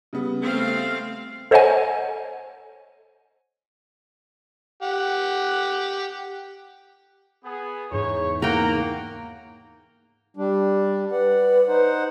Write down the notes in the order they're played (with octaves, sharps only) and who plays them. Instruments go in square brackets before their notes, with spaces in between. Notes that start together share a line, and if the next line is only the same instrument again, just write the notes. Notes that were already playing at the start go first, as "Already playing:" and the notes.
[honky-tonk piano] C#3 G3 B3
[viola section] A3 C4 F5
[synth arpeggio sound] A4 C5 C#5 D#5 F#5 G#5
[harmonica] G4 F#5
[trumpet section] B3 G#4
[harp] E2 G#2 D#4 [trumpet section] C#5
[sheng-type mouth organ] A#3 [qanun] A#4 G5 [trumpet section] F#5 A#5
[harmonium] G3 D4
[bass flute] B4 [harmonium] D5 F#5
[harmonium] D#4 C5 F#5